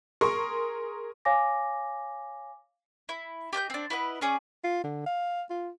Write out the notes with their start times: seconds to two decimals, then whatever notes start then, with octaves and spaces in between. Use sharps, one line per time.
0.21 G#4 A#4 C6 C#6
1.25 C#5 F5 G#5 D6 A#6
3.09 E4
3.53 G4 D#5 F#6 G6
3.70 C4 D4
3.90 E4 B4 D#5 F#5
4.21 C#4 G#4 D5
4.64 F4
4.84 D3
5.06 F5
5.50 F4